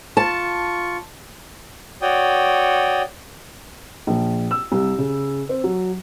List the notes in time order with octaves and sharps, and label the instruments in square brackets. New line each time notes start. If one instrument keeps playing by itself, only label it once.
[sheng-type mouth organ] F4 C#6 [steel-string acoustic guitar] A5
[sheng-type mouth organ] F#4 C#5 D5 G5 D#6
[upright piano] A#1
E6
C2
C#3
C4
F#3